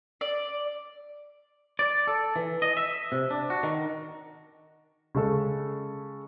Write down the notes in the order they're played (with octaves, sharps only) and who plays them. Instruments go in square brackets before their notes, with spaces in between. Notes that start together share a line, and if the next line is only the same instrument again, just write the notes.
[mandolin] D5
[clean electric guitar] D5
A4
E3
D#5
E5
C3
D4
F#4
D#3
[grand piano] C#3 G#3 A4